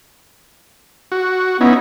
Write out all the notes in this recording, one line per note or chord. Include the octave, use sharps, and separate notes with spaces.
F#4
B3 C#4 D#4 E4